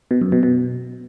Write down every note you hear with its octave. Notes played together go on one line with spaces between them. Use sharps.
B2
F#2
B2
B2